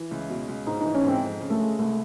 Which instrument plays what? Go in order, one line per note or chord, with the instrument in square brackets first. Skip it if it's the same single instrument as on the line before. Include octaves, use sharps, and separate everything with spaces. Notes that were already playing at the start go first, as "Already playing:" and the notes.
Already playing: [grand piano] E3 [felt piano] E4
[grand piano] C#2
B2
C#2
[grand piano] G#2 [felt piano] D#4
[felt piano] D#4
[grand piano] E3
[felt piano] C#4
[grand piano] G#2 [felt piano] C4
[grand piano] F2
C#3
[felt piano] A3
[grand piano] G#3
[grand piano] C2 [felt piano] A3